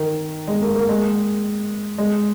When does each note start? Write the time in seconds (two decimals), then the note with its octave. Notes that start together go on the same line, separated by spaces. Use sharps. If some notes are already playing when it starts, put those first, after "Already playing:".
Already playing: D#3
0.48 G#3
0.62 A#3
0.75 A#3
0.89 G#3
1.98 G#3